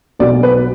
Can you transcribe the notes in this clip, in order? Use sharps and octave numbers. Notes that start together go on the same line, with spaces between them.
B1 B2 F#3 D5
B4